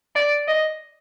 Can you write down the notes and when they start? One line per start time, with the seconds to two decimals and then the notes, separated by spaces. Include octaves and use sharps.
0.15 D5
0.48 D#5